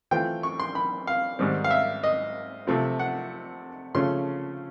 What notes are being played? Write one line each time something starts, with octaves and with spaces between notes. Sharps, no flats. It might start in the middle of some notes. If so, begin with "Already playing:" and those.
E3 A3 C4 F4 G5
C#6
C6
B5
F5
G#2 D#3 G3 C4
F5
E5
D#5
C3 F3 A3 C4 F4
F#5
C#3 F3 A3 C#4 C6